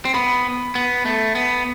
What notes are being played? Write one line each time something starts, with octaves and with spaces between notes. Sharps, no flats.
C4
B3 B5
B3
A3
B3